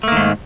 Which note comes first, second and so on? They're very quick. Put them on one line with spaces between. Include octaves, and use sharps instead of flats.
A3 A#3 D#3 G#2